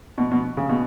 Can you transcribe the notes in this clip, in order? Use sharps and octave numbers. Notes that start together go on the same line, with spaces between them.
B2
B2
C#3
B2